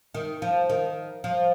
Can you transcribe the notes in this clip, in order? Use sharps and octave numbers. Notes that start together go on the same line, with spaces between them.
D#3
F3
D#3
F3